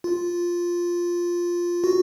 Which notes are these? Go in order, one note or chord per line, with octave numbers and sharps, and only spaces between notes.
F4
F#4